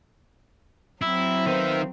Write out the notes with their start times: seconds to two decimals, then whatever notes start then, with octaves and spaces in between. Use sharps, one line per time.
1.02 F#3 C4 E4 E5
1.47 D#3 B3 F4 C5